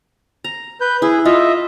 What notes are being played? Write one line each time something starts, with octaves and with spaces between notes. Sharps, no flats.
A#5
B4 G6
E4 G#4
F4 D#5 E5